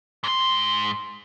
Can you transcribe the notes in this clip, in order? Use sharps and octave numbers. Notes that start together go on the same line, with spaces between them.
G#2 C6